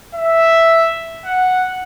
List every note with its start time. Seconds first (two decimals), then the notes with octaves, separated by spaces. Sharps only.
0.15 E5
1.25 F#5